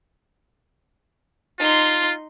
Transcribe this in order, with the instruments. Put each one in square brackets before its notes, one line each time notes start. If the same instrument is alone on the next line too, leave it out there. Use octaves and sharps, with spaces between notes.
[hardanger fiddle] D#4 C6 [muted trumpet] F4